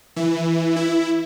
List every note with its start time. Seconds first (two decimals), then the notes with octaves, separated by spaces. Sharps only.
0.16 E3
0.76 E4